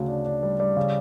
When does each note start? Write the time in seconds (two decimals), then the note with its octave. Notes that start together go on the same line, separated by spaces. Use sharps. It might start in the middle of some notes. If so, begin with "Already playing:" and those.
Already playing: D2 C#3
0.08 D4
0.25 D4
0.43 G3
0.60 G3
0.77 C#3